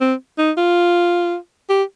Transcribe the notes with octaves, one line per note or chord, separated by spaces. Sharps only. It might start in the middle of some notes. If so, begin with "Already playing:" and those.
C4
D#4
F4
G4